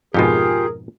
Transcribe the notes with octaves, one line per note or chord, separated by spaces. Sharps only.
F2 G#2 B2 F4 G4 G#4 A#4